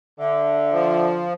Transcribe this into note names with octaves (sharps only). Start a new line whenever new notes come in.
D3 E5
F3